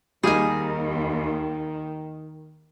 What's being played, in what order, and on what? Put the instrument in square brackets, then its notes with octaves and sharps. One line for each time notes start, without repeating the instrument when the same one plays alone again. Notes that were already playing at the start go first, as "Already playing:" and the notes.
[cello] D#2 [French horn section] D#3 [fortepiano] G3 A#3 D#4 [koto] G#4 G#5